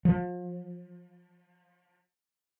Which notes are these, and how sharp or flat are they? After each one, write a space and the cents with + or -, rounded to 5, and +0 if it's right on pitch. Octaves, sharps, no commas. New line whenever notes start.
F3 +35